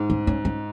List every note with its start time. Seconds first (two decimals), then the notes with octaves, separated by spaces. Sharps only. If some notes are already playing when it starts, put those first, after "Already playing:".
Already playing: G#2
0.10 C#4
0.27 C#4
0.45 C#4